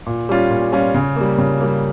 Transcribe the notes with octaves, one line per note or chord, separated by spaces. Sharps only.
A#2
G3 C#4 F4
A#2
G3 C#4 F4
C#3
G3 A#3
C#3
G3 A#3